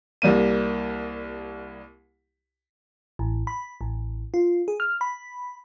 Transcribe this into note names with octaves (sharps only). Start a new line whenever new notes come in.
C2 G3 A#3 D#7
A1
B5
A1
F4
G#4
F6
B5